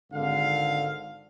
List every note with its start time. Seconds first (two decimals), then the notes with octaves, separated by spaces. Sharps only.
0.13 G#1 D3 F5